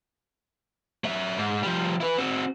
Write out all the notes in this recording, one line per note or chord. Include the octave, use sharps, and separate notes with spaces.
F#3 E5
G#2
F3 G3
E4 B4
C4 F#4